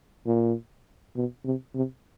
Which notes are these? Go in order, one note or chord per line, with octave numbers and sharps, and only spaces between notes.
A#2
B2
C3
C3